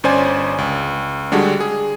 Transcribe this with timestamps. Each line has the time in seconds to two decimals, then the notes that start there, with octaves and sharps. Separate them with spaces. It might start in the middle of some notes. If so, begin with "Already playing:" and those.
0.04 G1 C#4 C5 D5 G#5
0.58 C#2
1.32 D3 G3 G#3 D4 F#4
1.60 G#4